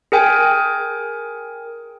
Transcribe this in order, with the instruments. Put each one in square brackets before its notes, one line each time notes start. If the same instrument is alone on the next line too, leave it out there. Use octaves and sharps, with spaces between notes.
[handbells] G#4 A#4 G5 G#5